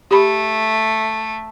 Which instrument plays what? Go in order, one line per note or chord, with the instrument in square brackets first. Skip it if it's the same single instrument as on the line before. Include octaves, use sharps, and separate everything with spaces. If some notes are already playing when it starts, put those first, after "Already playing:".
[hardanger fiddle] A3 [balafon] G4 B5